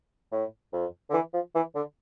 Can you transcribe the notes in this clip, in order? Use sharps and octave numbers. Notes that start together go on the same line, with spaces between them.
A2
F2
D3
E3
F3
E3
D3